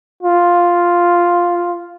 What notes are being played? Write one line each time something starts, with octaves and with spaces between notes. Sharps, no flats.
F4